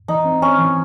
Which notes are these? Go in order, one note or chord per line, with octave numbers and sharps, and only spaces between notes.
E3 D#4
C4
C4 C#4
E3